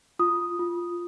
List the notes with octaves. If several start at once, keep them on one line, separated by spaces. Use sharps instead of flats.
F4 D#6
F4